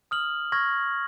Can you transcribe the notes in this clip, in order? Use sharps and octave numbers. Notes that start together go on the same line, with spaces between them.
D#6 F6 F#7
C#6 F6 G#6 A#6